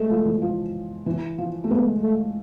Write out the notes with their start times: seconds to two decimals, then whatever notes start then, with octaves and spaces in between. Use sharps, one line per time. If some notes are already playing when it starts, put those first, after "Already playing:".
Already playing: G#3 A3
0.10 F3
0.25 E3
0.42 F3
1.06 E3
1.38 F3
1.64 A3
1.71 G#3 B3
2.03 A3